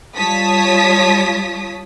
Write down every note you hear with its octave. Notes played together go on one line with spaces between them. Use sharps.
G3 F4 C#5 A5 D#6 B6